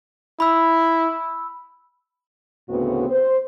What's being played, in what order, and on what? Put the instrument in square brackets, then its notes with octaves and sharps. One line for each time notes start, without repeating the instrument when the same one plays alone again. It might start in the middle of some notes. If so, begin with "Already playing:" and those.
[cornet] E4 [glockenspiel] B5 E6
[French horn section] D2 A2 C#3 B3 C4 F#4
C5